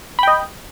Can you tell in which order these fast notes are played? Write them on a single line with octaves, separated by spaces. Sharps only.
B5 G5 D#5